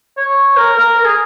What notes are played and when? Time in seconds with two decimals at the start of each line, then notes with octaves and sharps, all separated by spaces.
0.17 C#5
0.57 A#4
0.77 A#4
0.97 A#4
1.05 G#4